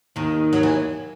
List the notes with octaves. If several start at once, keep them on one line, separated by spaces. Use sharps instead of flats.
D#2 D#3
F#3
E3